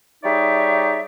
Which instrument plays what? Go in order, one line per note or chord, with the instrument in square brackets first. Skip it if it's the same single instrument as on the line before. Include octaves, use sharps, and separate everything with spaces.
[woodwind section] G3 D#4 G#4 C#5 D5 E5